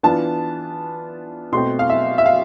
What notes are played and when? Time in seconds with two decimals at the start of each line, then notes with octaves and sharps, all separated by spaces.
0.03 E3 B3 D4 F4 A5
1.52 B2 A3 C4 C6
1.79 F5
1.90 E5
2.18 E5
2.26 F5